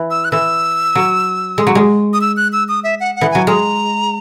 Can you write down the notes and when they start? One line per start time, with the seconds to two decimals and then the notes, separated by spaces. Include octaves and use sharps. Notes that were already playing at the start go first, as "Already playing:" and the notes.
Already playing: E3
0.11 E6
0.25 F#6
0.32 E3 E6
0.95 F#3
1.58 G#3
1.67 F#3
1.75 G#3
2.13 D#6
2.21 E6
2.37 F#6
2.53 E6
2.69 D#6
2.84 E5
3.00 F#5
3.16 F#5
3.21 E3
3.31 F#3 G#5
3.47 G#3 A#5